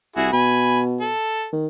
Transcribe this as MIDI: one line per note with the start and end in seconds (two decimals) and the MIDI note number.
0.16 0.29 36
0.16 0.29 64
0.16 0.29 66
0.16 0.29 68
0.33 1.11 47
0.33 0.80 80
0.33 0.80 83
1.01 1.48 69
1.53 1.68 51